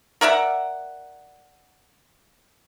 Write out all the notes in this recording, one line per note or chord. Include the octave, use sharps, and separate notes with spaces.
A#4 D5 E5 F#5